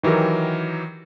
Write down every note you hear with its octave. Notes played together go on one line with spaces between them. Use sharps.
D#3 E3 F#3 G4 A#4